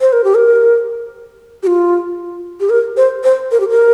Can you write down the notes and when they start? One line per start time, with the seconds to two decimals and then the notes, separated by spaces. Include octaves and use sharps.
0.01 C5
0.13 A#4
0.24 G4
0.36 A#4
1.63 G4
1.67 F4
2.60 G4
2.70 A#4
2.97 C5
3.24 C5
3.51 A#4
3.60 G4
3.69 A#4